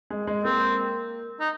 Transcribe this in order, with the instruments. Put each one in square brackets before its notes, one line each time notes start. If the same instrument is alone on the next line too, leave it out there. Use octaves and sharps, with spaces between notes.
[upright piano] G#3
G#3
[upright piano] A#3 [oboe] C4
[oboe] D#4